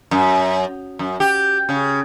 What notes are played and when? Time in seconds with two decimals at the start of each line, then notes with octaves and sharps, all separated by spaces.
0.11 F#2
0.99 F#2
1.20 G4
1.69 C#3